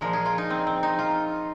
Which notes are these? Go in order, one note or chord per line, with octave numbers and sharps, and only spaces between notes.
A#2 F3 G#3 A#4
G#4
F4
D#4
C4
C4
D#4
F4